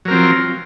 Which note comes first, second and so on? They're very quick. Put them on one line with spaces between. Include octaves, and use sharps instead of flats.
F#3 A#4 C4 F3